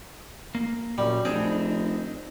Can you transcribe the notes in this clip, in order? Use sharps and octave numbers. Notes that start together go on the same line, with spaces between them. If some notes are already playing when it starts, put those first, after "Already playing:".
A#3
F#2 A#2 G3
F1 C4 D4 D#4 G#4